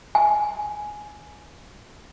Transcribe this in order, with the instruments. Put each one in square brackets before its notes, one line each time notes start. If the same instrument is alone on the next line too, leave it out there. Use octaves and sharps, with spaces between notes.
[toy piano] G#5